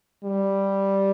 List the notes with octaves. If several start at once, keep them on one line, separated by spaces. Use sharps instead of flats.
G3